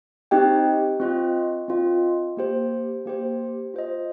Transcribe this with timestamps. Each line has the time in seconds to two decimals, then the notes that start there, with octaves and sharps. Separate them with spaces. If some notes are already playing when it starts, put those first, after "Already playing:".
0.31 C4 D#4 G4 D#5 G5
1.00 C4 F4 D#5
1.68 C4 F4 D#5
2.37 A#3 G4 C5
3.05 A#3 G4 C5
3.74 F4 C5 D#5